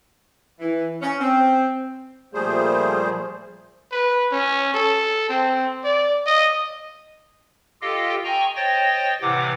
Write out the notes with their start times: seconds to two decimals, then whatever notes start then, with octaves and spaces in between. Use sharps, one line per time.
0.59 E3
1.01 C#4
1.20 C4
2.34 A#2 F3 G3 A3 G#4 C5
3.91 B4
4.32 C#4
4.74 A4
5.29 C4
5.84 D5
6.26 D#5
7.82 F4 G4 A4 D#5 F5 G5
8.24 D#5 G5 G#5 A#5 C#6
8.56 C5 C#5 D#5 G5 A6 A#6
9.22 A2 C3 E3 F#5 D6